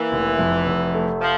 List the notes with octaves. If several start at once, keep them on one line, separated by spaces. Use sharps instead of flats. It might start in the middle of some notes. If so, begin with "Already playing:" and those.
Already playing: E3 A#3
F1
F2
F1
A3
F3